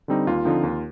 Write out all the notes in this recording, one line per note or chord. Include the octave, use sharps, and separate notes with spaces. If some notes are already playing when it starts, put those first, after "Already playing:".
D3 G3 C4 D#4
D#2 F4
D3 F3 C4 D#4
D#2